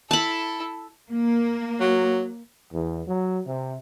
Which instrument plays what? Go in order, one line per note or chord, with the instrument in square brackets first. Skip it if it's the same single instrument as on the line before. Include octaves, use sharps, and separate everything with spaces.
[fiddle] E4 A4 [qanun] A5 B5
[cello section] A#3
[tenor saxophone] F#3
[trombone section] E2
F#3
C3